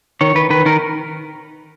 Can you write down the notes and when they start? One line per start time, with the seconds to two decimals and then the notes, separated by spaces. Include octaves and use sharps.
0.21 D#3 C#5
0.35 D#3 B4
0.50 D#3 B4
0.66 D#3 A#4